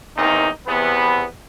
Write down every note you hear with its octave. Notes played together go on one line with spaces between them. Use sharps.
E2 D#3 A#3 C4 D#4
E2 C3 B3